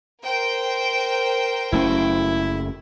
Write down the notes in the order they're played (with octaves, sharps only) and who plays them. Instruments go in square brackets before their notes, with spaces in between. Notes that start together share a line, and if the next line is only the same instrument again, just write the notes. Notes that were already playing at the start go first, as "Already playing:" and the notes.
[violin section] A#4 C5 G5
[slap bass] F#1 A3 C#4 [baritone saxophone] E4